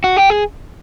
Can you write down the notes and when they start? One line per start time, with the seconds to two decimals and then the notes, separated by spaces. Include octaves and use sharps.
0.04 F#4
0.17 G4
0.30 G#4